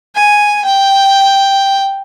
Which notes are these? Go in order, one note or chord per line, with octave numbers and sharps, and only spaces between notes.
G#5
G5